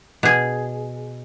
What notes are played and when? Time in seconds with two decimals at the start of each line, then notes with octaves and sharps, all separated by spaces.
0.23 B2 G#4